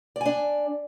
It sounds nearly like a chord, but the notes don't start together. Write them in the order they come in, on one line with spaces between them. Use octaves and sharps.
D5 G#5 D4